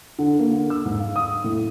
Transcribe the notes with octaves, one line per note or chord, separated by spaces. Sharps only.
D3
A#3
D3
E6
G#2
F5
D#6
A2